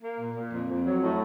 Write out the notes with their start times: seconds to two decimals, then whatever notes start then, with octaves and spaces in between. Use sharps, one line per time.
0.03 A#3
0.20 A#2
0.36 A#2
0.52 F2
0.69 F2
0.86 F#3
1.01 A2